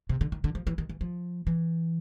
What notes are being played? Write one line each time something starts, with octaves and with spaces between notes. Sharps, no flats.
C3
D3
D#3
D3
F3
E3
D#3
E3
F3
E3